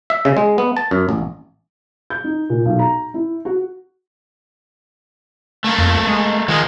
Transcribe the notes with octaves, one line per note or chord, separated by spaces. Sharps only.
E5
C#3
G#3
B3
A5
F#2
A1
G6
D#4
A#2
B1
A#5
E4
F#4
A3 A#3
F2
G#3
D#3 F3 G#3